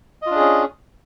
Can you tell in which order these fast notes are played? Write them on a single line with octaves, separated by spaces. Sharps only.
D#5 F4 D4 G#4 C#4